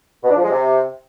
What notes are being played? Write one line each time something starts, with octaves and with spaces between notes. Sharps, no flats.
B2
D4
F3
G#3
C3